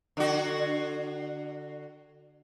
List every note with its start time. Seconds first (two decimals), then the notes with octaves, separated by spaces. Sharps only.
0.17 D3 F#4